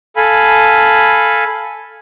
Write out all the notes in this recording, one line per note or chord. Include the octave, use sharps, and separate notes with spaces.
A4 F5 G#5 B5